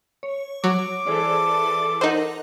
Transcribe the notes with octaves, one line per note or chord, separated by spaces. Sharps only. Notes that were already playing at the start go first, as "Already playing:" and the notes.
C#5
F#3 D6
E3 G#4 A4 C5 D5
D#4 A#4 C5 D#5 F#5